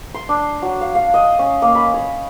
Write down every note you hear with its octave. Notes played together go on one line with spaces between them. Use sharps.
C6
D4
F#3
F5
F5
D#5
C#4
A#3
B5
C#5